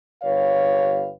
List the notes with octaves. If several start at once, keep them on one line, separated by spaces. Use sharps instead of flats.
G1 G4 B4 C#5 F5